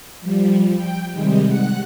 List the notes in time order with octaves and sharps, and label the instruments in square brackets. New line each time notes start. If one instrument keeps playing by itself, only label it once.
[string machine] F3 G3
G5
C3 D#3 G3 G#3
F#5 F#6